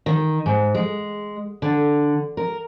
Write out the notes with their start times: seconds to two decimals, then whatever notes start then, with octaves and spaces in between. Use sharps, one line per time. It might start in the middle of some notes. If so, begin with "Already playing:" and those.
0.06 D#3
0.46 G#2
0.75 G#3
1.62 D3
2.37 A#4